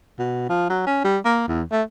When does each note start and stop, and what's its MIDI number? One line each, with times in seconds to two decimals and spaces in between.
0.19 0.46 47
0.49 0.68 53
0.70 0.82 54
0.87 1.02 61
1.04 1.18 55
1.25 1.44 58
1.48 1.63 40
1.72 1.83 57